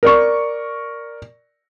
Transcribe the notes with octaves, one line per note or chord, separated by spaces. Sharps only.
A#4 D5 C#6